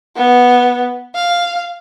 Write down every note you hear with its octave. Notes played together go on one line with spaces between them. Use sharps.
B3
F5